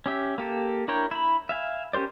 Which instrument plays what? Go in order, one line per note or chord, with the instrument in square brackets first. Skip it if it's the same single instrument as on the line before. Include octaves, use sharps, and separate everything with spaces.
[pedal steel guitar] C#4 G4 E5
A#3 G4 A4
D4 E4 A#4 C#5 G5
E4 B5
E5 F5 G#5
C#4 G4 A#4 C5 D5